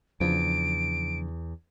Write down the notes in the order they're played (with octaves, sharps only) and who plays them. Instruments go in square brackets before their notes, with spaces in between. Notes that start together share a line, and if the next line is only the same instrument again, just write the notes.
[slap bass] E2 [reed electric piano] C#3 F3 D4 [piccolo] D7